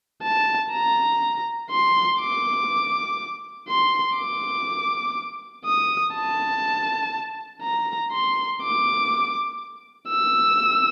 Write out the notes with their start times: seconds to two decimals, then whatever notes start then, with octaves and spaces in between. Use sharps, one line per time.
0.23 A5
0.72 A#5
1.71 C6
2.20 D6
3.68 C6
4.17 D6
5.65 D#6
6.15 A5
7.63 A#5
8.12 C6
8.62 D6
10.10 E6